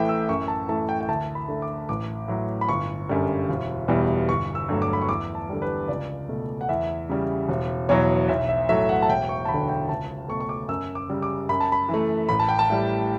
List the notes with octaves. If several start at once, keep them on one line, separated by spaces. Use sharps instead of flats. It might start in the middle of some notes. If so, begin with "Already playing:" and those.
Already playing: A1 A2 E3 A3 E5 G5
E6
F#2 C#6
A5
E3 A3 A5
G5
G5
D2 A5
B5
D3 A3
D6
A1 D6
A2 F#3
B5
G1 C#6
F#2 D3 G3
E1
E2 B2 G3
G1 C#6
E6
G2 F#3 A3
D6
B5
C#6
E2 D6
A5
D3 G3 A4
B4
C#2 D5
B2 A3
F#5
E2 E5
C#3 G3
E1
E2 B2 F#3 C#5
B1 E5
E5
A2 F#3 A3 E5
F#5
A5
E1 G5
C#6
A5
D2 B5
D3
G5
C#2 A5
B2 A3 C#6
C#6
D6
F#2 E6
D6
C#3 G3
D6
F#2 B5
A5
B5
E3
A3
A1 B5
A5
G5
A5
A2 G3